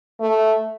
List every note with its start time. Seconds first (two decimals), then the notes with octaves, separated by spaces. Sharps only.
0.20 A3